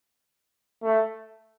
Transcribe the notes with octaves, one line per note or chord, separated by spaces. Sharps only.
A3